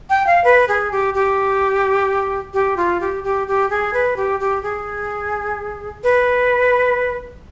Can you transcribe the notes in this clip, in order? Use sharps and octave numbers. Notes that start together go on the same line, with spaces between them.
G5
F5
B4
G#4
G4
G4
G4
F4
G4
G4
G4
G#4
B4
G4
G4
G#4
B4